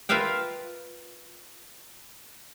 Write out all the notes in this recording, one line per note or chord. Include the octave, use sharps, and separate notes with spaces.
F4 A#4 B4 E5 F5 G5